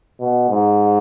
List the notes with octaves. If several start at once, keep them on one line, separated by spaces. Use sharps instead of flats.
B2
G#2